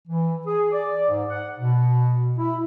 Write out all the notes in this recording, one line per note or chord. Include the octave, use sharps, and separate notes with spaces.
E3
G#4
D5
G#2
F#5
B2
E4